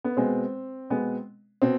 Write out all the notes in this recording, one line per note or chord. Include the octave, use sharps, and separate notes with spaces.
B3
B2 G#3 B3 C4
B2 G#3 B3
B2 C4